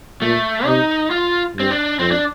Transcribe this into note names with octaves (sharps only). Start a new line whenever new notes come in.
A#2 A3
C3 D#4
F4
G2 C4
D4
F2 C4
D4